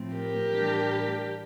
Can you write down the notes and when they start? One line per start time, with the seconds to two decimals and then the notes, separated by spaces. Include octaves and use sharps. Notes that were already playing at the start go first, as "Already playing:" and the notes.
Already playing: A2 F3 A3 C4
0.15 G4 A#4
0.51 A2 E3 G3 D4